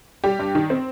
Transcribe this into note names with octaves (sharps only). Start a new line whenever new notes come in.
G3 G4
G2
D#3
C4